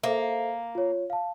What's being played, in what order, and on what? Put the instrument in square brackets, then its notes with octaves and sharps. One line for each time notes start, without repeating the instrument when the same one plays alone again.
[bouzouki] A#3 [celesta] A4 C5 E5
[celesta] F4 C#5
F5 A5